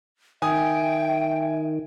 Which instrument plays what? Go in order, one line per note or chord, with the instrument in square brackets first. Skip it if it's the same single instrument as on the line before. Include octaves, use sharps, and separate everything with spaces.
[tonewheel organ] D#3 [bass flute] E5 [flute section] G5 [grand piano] G#5 D#6